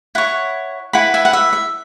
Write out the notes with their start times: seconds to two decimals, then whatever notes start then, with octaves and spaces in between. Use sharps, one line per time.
0.15 E4 C#5 F#5
0.93 E4 B4 F#5 B5
1.14 E5 G#5
1.25 F#5
1.33 E5
1.53 E5